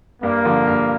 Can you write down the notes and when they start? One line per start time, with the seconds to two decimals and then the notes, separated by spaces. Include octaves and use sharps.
0.23 G2 A#3
0.45 D3 F3
0.67 G2